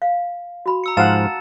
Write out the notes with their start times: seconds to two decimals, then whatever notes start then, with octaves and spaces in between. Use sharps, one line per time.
0.02 F5
0.66 F#4 B5
0.84 A#5 E6 C#7
0.97 G#2 F3 F5 F#5 A5 A6 E7